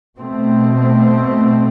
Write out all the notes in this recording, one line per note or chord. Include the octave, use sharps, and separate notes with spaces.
B2 A3 C4